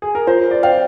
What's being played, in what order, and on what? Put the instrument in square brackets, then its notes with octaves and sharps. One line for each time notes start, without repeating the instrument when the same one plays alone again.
[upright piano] G#4
A#4
[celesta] F4 [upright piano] C5
[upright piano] D5
[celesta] C5 G5 [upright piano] F5